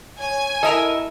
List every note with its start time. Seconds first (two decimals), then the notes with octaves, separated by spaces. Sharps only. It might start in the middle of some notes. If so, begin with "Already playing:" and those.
0.19 C#5 G#5
0.63 E4 A4 A#4 D#5 E5